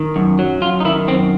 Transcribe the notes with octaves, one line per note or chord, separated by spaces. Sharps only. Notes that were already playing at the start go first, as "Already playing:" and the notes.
Already playing: D#3
F#2
F#3
F#2 F4
D#4
D#3 E4
F#2 C4